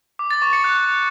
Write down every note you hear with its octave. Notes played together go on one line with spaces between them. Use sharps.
D6
A6
C#6
C#7
F#6